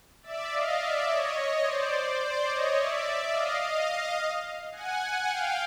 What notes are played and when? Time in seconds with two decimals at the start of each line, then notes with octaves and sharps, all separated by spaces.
0.23 D5 E5
0.51 D#5 F5
0.79 D5 E5
1.07 C#5 D#5
1.63 C5 D5
2.19 C5 D5
2.47 C#5 D#5
2.76 D5 E5
3.31 D#5 F5
3.59 D#5 F5
4.72 F#5 G#5
5.28 F5 G5